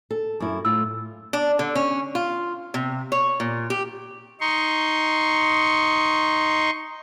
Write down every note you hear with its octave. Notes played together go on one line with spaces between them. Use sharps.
A4
F#2 E4
A2 F4 E6
D4
D3
C#4
F4
C3
C#5
A#2
G4
D#4 C6 C#6